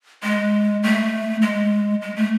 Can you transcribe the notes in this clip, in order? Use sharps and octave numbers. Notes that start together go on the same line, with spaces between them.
G#3
A3
G#3
G#3
A3